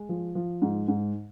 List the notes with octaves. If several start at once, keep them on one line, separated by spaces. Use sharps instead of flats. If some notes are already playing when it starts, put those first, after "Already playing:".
Already playing: G#3
F3
F3
G#2
G#2